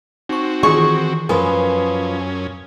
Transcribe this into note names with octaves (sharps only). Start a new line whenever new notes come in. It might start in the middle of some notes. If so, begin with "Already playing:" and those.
C4 D#4 F#4 C#6
D#3 E3 F4 G#4 C#6
F#2 F3 C#4 A#4 B4 G#5 D#6